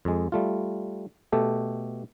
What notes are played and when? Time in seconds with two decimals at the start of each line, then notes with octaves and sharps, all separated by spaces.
0.05 F2 G#3
0.32 G3 A3 F4
1.32 B2 A3 G4 A4